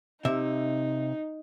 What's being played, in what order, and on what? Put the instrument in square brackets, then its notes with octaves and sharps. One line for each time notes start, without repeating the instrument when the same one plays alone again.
[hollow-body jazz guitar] C3 E5 [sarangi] D#4